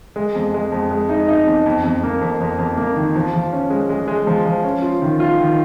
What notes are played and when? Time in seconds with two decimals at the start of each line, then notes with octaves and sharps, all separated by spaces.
0.16 G#3
0.35 F2
0.54 G#3
0.72 F2
0.91 G#3
1.09 D#4
1.28 D#4
1.47 F2
1.66 F2
1.84 F2
2.03 A#3
2.21 F2
2.40 F2
2.59 F2
2.78 A#3
2.96 D#3
3.15 F3
3.34 F3
3.53 C#4
3.70 G#3
3.89 G#3
4.08 G#3
4.27 F3
4.46 F3
4.64 C#4
4.82 F4
5.02 D#3
5.20 F4
5.39 D#3